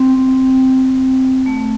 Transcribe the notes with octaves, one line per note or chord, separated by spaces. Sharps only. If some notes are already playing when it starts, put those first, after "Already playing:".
Already playing: C4
A3